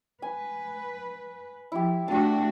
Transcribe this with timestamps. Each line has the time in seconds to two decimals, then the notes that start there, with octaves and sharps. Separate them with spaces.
0.22 B4 G#5
1.72 F3 E4 G4
2.08 A3 D4 F#4 G4 A5